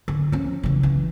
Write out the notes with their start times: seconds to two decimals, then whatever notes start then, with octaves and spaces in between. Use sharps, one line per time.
0.08 D3
0.32 F3 C#4
0.63 C#3 E3
0.83 E3